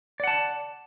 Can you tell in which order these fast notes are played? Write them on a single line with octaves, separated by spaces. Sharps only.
D5 F#5 A5